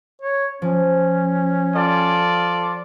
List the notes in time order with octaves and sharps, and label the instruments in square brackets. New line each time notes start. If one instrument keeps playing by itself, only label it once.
[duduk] C#5
[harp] F3 [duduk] C#4
[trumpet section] F4 A4 D5